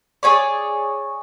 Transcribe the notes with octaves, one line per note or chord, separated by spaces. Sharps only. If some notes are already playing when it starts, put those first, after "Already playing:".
G#4 C#5 D5